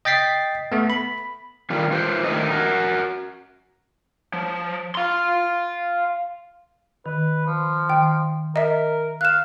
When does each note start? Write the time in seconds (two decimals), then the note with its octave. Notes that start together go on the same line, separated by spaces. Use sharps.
0.05 D#5 G5 A6 B6 C7
0.72 A3 B3
0.90 B5
1.70 D3 D#3 G3 F4
1.92 F4 B4 C5
2.24 D3 D#3 A3 D#5
2.50 F#4 A#4
4.33 F3
4.95 F5 C6
7.06 D#3 B4
7.47 F3
7.90 D#3 G5
8.56 A#4 D#5 E5
9.21 F5 F#6 E7